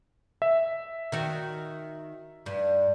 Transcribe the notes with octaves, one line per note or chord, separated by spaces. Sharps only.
E5
D#3 F#4
G2